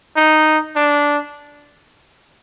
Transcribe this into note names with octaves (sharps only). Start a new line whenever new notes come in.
D#4
D4